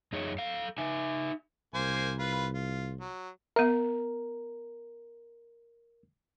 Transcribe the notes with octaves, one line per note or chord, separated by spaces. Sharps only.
F#2 D#4 G#4 C#5
A4 F5
D#4 E5 G#5
C2 A#3 C5 G#5
F4 B4
F4
F#3
B3 A#4 E5